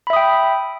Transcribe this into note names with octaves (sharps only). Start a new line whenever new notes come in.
E5 G5 B5 D#6